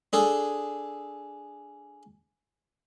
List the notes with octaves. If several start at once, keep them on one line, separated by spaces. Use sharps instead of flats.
D4 G#4 A4